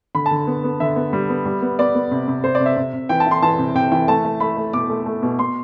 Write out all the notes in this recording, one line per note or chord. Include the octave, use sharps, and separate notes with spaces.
D3 B5
A5
D3
B3
B3
D3 E5
B3
G3
B3
G3
B3
B3 D5
B3
C3
C3
C3 C5
D5
C3
E5
C3
C3
E3 G5
A5
E3
C6
E3 A5
C3
C3 G5
E3 G5
A3 A5
A3
A3 B5
A3
B2 D6
A3
A3
B2
B2 C6